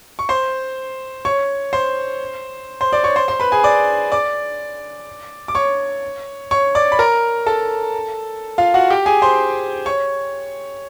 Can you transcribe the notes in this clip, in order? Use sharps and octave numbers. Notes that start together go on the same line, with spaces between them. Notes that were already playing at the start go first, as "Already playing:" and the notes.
C#6
C5 C6
C#5 C#6
C5 C6
C5 C6
D5 D6
C#5 C#6
C5 C6
C5 C6
B4 B5
G#4 G#5
D5 D6
D5 D6
D6
C#5 C#6
C#5 C#6
D5 D6
B5
A#4 A#5
A4 A5
F4 F5
F#4 F#5
G4 G5
G#4 G#5
C5 C6
C#5 C#6